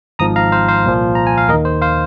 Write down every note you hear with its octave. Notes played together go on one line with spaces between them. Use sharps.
G#1 G#2 F3 A#5 D#6
F5 A#5
C5 F5
C5 F5
C2 A#2 F3
A#5
G#5
F5
D#2 D#3 A#4 D#5
C5
C5 F5